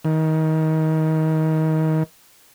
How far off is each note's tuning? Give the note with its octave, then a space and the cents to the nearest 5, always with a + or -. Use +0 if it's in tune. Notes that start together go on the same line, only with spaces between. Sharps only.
D#3 +25